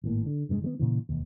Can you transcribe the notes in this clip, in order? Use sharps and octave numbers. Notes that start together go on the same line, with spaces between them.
G#1 A2 A#3
D3
F1 G2 C3 G#3
D#3 G3 B3
A#2 C#3 E3
E1 D#2